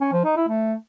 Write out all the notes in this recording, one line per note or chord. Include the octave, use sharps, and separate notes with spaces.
C#4
F3
D#4
E4
A3